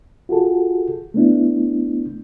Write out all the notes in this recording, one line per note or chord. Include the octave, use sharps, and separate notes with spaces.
F4 F#4 G#4 A4
A3 B3 D4 E4